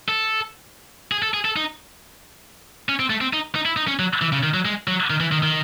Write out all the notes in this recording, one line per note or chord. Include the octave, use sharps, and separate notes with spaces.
A4
G#4
A4
G#4
A4
D#4
C#4
C4
A3
C4
D#4
D#4
E4
D#4
C#4
F#3
E3
C#3
D#3
F#3
G#3
F#3
D#3
E3
D#3
D#3